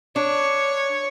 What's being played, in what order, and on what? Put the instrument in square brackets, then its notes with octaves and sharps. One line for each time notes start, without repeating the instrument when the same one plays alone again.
[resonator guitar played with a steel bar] D4 [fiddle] C#5